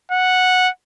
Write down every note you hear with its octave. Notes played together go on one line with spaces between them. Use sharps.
F#5